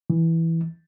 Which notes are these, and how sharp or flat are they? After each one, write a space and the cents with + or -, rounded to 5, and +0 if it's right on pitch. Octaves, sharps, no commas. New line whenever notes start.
E3 -5